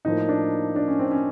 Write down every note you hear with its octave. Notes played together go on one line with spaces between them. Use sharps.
A2 F3 A#3 D#4
D4
D4
C#4
C4
C#4